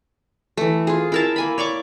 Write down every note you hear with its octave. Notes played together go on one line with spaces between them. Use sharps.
E3 A3
F4 G#4
E4 A#4 A5
A#3 G#5 B5
C#5 D5 C#6 D6